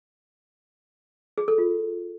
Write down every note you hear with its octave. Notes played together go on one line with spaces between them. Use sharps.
G#4
A4
F4